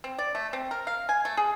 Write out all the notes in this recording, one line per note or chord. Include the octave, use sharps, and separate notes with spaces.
C4
D5
A3
C4
A#4
F5
G#5
A3
G#4